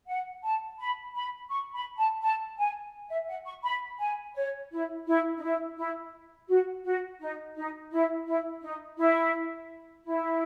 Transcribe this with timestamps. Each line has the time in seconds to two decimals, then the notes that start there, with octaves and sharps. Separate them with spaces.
0.08 F#5
0.43 A5
0.79 B5
1.15 B5
1.50 C#6
1.75 B5
1.98 A5
2.22 A5
2.58 G#5
3.10 E5
3.28 F#5
3.46 C#6
3.63 B5
3.99 G#5
4.35 C#5
4.71 E4
5.07 E4
5.38 D#4
5.42 E4
5.77 E4
6.48 F#4
6.84 F#4
7.20 D#4
7.56 D#4
7.92 E4
8.26 E4
8.61 D#4
8.98 E4
10.05 E4